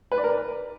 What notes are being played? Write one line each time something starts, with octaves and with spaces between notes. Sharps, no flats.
B4
D5
A#4
B4